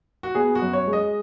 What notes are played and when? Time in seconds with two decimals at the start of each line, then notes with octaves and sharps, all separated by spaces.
0.23 F#4
0.35 B3 G#4
0.55 F#4
0.62 F#2
0.73 C#5
0.87 G#3
0.93 D#5